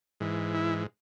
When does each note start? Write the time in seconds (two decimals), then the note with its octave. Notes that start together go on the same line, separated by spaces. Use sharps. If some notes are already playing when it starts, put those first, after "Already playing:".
0.20 G#2 E3
0.54 E4